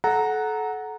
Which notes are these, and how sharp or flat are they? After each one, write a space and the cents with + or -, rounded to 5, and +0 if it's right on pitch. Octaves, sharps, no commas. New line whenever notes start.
A4 -30 F#5 +0 A#5 -5